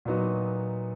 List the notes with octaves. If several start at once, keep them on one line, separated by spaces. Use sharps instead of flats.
A#2 F#3 B3 D#4 F#4